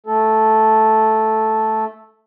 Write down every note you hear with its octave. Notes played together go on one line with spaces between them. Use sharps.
A3 A4